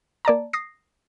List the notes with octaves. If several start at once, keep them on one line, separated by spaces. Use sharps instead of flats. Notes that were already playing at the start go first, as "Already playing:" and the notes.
A#3 D5 A5 A#5
D#6 A#6 C7